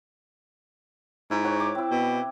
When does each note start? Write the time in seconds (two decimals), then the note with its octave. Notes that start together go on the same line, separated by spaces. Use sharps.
1.31 G#2 E4
1.44 C5 C#5 F#5
1.60 D6
1.75 C4 E4
1.91 B2